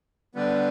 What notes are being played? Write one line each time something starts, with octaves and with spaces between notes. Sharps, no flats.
D3 G3 B3